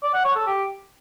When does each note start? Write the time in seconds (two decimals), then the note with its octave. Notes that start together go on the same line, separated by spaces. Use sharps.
0.03 D5
0.14 F#5
0.25 C#5
0.36 A4
0.47 G4